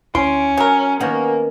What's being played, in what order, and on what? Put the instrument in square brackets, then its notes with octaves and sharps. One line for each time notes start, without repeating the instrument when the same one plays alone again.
[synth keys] D2 E4 D7 [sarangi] C#4 [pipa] C6
[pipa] F#3 A#4 [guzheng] C#5 [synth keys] G#5
[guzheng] D#3 B3 C#4 [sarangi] A#3 [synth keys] F#5 G#5 C#6